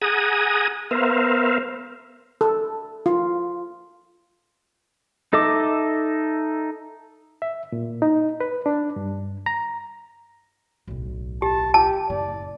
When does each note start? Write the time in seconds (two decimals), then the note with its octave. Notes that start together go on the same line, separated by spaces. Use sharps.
0.02 G#4 F#5 G#5 A#5 D#6
0.91 B3 A#4 C5 E5 F5
2.41 A4
3.06 F4
5.33 D#4 A4 D#5 E5 D6
7.42 E5
7.72 A#2
8.02 D#4
8.40 B4
8.66 D4
8.96 G2
9.46 A#5
10.87 D1 B1
11.42 G4 A5
11.74 G4 A5
12.09 F#1 A2 D5